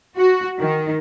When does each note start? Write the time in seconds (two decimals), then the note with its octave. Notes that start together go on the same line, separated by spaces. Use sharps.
0.17 F#4
0.59 D#3